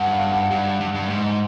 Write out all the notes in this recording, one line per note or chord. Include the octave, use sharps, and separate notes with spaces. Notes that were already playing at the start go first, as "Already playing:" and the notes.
Already playing: G2 F#5
F5
F#5
G2
G2
G2
G#2